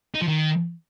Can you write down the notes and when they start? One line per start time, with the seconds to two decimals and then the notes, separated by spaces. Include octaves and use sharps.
0.14 D#4
0.21 F3
0.27 D#3